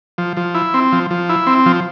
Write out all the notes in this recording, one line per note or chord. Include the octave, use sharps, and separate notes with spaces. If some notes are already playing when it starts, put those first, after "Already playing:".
F3
F3
E4
C4
F3
F3
E4
C4
F3